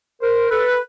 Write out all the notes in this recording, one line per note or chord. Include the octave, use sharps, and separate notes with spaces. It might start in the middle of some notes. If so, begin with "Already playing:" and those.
A#4 C5
A4 B4